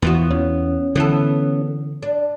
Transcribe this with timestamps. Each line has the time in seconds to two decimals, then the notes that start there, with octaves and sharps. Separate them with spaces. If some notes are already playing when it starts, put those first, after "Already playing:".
0.02 E2 E3 B3 F4 F#4
0.30 E2 C#4
0.95 D3 E3 B3 A4
2.03 D4